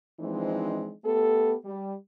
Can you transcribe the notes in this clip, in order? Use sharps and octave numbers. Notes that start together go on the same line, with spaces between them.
E3 F3 G#3 C4 D4 D#4
A3 B3 G4 A4
G3